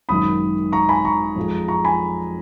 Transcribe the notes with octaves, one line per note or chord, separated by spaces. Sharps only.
G#1 F#2 D#3 B5 D#6
A#5 C#6
G#5 B5
A#5 C#6
F2 F3 G#3
A#5 C#6
G#5 B5